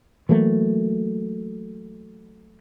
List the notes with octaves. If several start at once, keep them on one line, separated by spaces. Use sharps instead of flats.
E3 F#3 A3 A#3